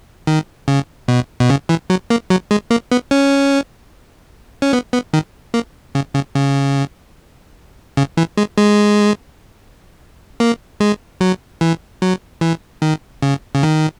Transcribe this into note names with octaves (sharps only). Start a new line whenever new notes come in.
D#3
C#3
B2
B2
C#3
E3
F#3
A#3
F#3
G#3
A#3
B3
C#4
C#4
B3
B3
D#3
A#3
C#3
C#3
C#3
C#3
E3
G#3
G#3
A#3
G#3
F#3
E3
F#3
E3
D#3
C#3
C#3
D#3